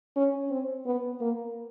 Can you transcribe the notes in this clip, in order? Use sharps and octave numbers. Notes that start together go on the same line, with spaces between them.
C#4
C4
B3
A#3